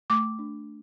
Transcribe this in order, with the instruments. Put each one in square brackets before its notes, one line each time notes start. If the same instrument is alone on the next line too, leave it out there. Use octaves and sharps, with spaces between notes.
[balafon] A3 D6
D4